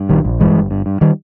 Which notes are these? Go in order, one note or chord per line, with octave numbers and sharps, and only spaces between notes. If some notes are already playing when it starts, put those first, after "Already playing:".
Already playing: G2
A#1 D#3 G3
A#1
G2 E3 G#3
G1
G2
G2
D#3 G3